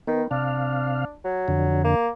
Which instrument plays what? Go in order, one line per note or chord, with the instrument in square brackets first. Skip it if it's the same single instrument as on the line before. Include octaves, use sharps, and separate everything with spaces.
[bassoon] D#3 [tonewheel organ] B3
[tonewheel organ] C3 F5 [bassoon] D4
[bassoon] F#3
[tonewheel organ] F2 D3
[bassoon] A#3